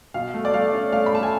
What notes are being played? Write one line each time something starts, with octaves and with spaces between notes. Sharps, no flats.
B2 F5
A3
D5
A3 F5
C#4
A3 F5
B5
A3 A5
G#5